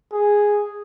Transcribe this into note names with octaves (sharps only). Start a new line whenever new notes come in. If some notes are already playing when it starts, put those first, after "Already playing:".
G#4